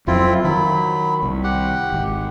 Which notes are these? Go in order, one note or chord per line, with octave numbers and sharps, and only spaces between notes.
F2 F3 F#3 C4 E4 F4
D#3 F#3 B5
C2
G4 F#5
G#1